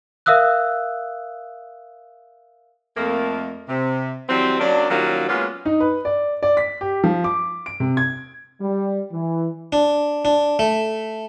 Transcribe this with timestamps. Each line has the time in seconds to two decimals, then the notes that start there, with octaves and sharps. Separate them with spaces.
0.26 A#4 E5 F5 D#6 E6 F#6
2.96 F2 A3 A#3
3.69 C3
4.29 E3 F#3 G3 C4
4.60 F#3 A#3 C#4 D4
4.90 D#3 F#3 G3 A#3 C#4 F4
5.28 F#3 G#3 A#3 B3 C#4 F4
5.66 D#4
5.80 B4
6.05 D5
6.43 D5
6.57 B6
6.81 G4
7.04 F3
7.24 D6
7.66 D7
7.80 C3
7.97 G#6
8.61 G3
9.12 E3
9.72 D4
10.25 D4
10.59 A3